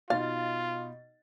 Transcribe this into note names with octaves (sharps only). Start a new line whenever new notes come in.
B2 D#4 F4 F5 A6